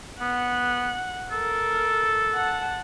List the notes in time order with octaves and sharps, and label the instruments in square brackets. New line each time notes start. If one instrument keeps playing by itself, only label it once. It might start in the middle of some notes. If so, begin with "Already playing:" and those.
[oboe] B3 [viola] F#5
[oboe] A4 [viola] A#4
[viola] F#5 A5